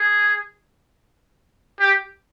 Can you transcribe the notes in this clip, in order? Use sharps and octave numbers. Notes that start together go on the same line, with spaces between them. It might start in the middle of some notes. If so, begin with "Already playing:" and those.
Already playing: G#4
G4